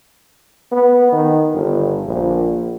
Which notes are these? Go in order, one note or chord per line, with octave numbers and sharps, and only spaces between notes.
B3
D#3
G1
A#1